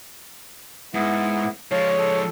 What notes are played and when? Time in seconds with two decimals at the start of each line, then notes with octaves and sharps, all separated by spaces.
0.94 G#2 B3 E4
1.72 F3 G#3 C#5 F5 A5
1.98 A4